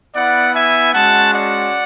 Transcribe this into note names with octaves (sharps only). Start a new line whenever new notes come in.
B3 E4 D5 F#5
E5 G#5
G#3 C#4 F#4 F#5 A5
D5 F#5